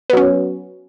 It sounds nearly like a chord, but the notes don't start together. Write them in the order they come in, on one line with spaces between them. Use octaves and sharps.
B3 F#3 C#4